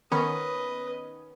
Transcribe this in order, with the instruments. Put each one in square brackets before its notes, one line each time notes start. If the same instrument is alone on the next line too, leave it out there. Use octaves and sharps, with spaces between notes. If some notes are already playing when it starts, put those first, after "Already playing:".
[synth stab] D#3 B3 C#4 [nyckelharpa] B4 D#5